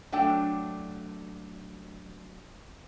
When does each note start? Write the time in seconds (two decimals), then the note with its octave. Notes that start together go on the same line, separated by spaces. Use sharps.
0.12 F#3 A3 D4 G5